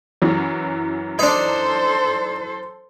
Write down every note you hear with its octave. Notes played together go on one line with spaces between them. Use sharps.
F#2 E3 F#3
D4 D#4 A4 C5